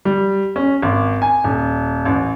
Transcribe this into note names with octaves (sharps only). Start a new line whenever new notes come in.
G3
C#4
G#1
G#5
D#1
A1